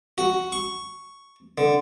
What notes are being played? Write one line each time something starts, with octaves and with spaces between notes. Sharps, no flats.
F#4
C#6
D3